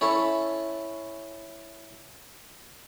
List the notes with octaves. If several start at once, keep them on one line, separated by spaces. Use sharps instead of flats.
C#4 E4 A4 C#5